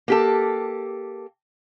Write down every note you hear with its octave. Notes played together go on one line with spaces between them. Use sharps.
A#3 G4 A4